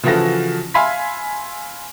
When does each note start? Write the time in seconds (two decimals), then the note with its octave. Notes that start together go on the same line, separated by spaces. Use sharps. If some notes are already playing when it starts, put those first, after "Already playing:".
0.03 C#3 E3 F3 F#4 A4 A#6
0.74 E5 F5 G#5 B5 C6 B6